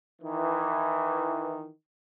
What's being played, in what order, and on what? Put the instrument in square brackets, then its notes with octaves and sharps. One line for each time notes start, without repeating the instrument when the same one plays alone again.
[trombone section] D#3 E3